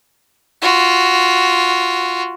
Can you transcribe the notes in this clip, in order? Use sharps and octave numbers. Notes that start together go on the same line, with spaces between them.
F4 F#4